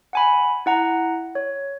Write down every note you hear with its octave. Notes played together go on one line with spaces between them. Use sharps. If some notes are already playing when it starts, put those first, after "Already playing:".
F#5 G#5 B5
E4 F#5 A#5
C#5